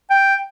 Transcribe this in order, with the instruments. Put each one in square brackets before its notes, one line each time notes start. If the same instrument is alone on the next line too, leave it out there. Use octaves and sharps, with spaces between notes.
[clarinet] G5